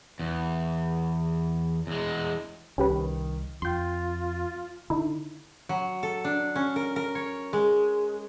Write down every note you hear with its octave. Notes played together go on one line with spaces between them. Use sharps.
E2
E2 G#3
C2 D#3 C#4 G4 B4
F2 F4 G5 C6
D3 D#4 E4
F#3
A4
D4
C#4
A#4
A#4
C#5
G#3